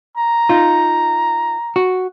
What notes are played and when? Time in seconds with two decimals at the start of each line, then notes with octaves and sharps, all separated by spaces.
0.17 A#5
0.49 D#4 F4
1.76 F#4